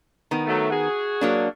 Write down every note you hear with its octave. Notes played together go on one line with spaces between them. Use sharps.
D#3 B3
F#3 A3
F#4 G#4
F#3 A#3 D4